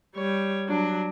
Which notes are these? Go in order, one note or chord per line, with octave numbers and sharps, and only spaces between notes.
G3 C#5
F#3 D4